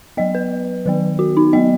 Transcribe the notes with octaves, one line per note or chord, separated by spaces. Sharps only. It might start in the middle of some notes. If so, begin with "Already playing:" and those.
F#3 B3 D#5
B4
D#3 F#3 B3
F#4
D#4
F#3 B3 D#5